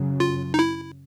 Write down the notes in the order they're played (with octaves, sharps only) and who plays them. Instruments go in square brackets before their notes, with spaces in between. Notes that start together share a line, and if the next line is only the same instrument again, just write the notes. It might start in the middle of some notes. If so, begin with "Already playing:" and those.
Already playing: [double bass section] F#2 C#3 F#3
[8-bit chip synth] F4
D#4
E4